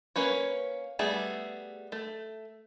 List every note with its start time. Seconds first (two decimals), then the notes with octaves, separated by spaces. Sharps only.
0.16 A#3 C#4 B4 C#5
0.99 G3 A3 B3 G#4 E5
1.92 A3